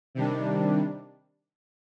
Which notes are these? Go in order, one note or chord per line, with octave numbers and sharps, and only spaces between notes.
C3 D#3 G3 D4